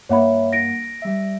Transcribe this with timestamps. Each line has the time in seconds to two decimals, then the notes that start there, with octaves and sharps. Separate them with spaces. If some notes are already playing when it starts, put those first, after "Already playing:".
0.09 G2 A#3 C#5 E5 F#5 B5
0.53 A#6 D7
1.02 G3 E5